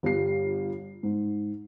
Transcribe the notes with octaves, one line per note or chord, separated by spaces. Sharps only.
G1 G3 F4 C7
G#2